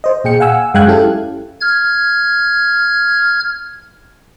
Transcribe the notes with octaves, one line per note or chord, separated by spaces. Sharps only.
C5 D#5
A#2 G#4 G5 C#7
F5 F#5 G#5 E6
F#2 G#3 F5 G5 F#6 G#6
C#4 E4 G4 A4 F5
F6 G#6